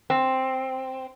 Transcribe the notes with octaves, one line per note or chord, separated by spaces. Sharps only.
C4